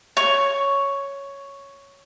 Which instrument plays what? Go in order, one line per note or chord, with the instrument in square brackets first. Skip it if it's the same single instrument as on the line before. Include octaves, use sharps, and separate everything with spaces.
[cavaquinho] C#5 C#6